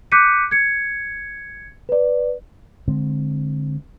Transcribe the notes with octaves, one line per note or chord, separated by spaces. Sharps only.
D6 F#6 G6 B6 C#7 D#7
G#6 C#7
B4 D5
D3 G#3 C4